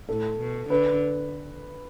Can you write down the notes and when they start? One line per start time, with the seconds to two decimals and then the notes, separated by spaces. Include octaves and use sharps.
0.08 A2 A4
0.39 B2
0.70 D3 B4